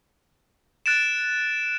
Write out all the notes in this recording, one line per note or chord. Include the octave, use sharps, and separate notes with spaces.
F#6 A6 D7 E7